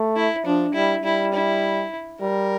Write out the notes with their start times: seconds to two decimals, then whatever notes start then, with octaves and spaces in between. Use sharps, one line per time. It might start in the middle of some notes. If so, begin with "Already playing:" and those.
Already playing: A3
0.16 E4
0.45 F3 D4
0.74 G3 E4
1.04 G3 E4
1.34 E4
2.21 G3 A#4